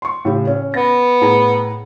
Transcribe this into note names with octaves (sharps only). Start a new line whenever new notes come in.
C6 C#6
A2 C#3 G4
C#4 C#5
B3 A#6
A2 G#4 A#5